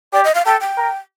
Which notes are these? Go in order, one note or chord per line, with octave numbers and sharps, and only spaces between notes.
G4 D5
D#5
F5
A4 G5
G5
A#4